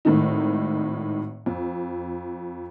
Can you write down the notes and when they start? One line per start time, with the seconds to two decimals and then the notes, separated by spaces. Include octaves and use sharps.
0.05 G#1 A2 D#3 D#4
1.46 F2